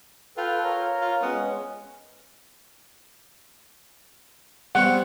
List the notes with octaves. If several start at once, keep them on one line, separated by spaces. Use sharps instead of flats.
F4 A4 B4 G5
A#4 C#5 A#5
F4
G#3 B3 C#4
G3 B3 C4 F#5